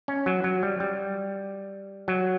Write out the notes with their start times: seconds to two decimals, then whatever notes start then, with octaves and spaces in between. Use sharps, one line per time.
0.08 C#4
0.26 F#3
0.44 F#3
0.63 G3
0.80 G3
2.08 F#3